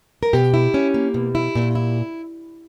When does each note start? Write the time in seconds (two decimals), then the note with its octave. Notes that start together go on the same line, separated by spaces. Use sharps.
0.23 A#4
0.33 B2 G4
0.54 E4
0.74 C#4
0.94 A#3
1.14 B2
1.35 E4
1.55 A#2
1.75 E4